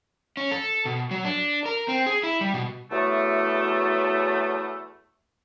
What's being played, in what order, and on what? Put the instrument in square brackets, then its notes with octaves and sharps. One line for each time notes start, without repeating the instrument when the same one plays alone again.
[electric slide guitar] C#4
A4
B2
F#3
D4
A#4
C4
G#4
E4
G3
B2
[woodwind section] E2 F#3 A3